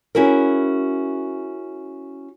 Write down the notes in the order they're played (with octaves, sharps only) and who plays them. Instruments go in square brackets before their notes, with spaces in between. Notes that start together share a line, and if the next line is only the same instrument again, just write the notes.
[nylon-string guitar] C#4 E4 F#4 G#4 A#4